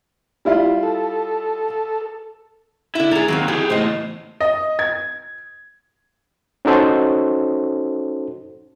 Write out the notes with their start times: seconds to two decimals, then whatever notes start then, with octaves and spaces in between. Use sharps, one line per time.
0.45 G3 E4 F4
0.83 A4
2.95 D3 E4 E5
3.11 G#2 G#4 A4 A#5
3.28 D#2 F#3 A#3 C4
3.48 E3 G4 G#4
3.70 E2 A2 C5 D#5
4.41 D#5
4.79 G#6
6.65 C#4 D#4 F#4 A4 C5